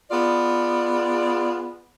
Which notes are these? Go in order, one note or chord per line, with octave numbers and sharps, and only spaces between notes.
B3 F4 G#4 D5